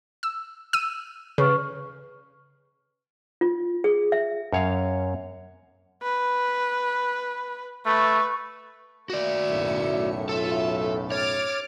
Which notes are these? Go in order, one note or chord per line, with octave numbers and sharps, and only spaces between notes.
E6
E6 D#7
C#3 B4 C#6 F6
F4
G#4
E5
F#2 C#5 F5
B4
A3 B4 C#6
A#3 F#4 D5 E5 C#7
B1 F#2 A2
F4 A4 E5 A5
C#5 D6 F6 A6